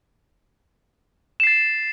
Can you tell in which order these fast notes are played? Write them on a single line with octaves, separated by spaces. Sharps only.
E7 C7 A6